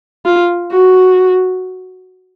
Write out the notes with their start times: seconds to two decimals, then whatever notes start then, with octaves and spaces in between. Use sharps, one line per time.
0.26 F4
0.72 F#4